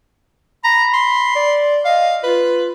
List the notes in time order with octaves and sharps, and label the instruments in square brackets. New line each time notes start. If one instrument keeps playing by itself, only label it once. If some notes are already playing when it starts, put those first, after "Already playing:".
[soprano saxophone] A#5 [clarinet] B5
[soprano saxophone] C6
[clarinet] D5
[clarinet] D#5 [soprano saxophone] F5
[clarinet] F4 [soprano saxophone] B4